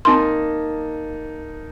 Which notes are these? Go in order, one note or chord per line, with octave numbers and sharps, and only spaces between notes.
A#3 C4 D#4 A5 C6